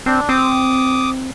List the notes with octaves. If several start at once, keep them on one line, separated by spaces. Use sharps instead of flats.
C4 D4
C4 D6 D#6